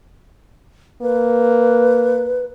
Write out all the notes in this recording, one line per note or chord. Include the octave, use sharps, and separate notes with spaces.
A#3 B4